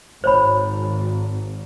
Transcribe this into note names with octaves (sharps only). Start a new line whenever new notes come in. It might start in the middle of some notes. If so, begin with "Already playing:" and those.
G#1 C5 C#5 B5